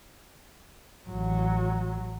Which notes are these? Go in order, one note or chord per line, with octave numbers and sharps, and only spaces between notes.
A1 F#3